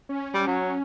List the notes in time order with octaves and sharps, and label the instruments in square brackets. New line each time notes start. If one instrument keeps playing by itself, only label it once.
[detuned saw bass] C#4
[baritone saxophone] G3
F#3